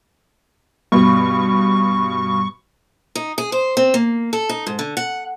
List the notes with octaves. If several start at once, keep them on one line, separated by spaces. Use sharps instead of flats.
G2 B2 C#6
D#4
G#4
C5
C4
A#3
A4
D#4
G#2
D3
F#5